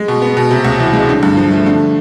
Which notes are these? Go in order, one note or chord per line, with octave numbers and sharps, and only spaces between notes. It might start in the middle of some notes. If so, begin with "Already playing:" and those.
Already playing: G#3
B2
B3
B2
C3
C#2
E3
G#3
D3
G2
F3
A3
D3